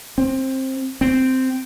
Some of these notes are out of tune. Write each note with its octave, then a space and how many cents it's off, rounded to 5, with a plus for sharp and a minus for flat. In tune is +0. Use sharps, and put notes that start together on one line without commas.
C4 +15
C4 -10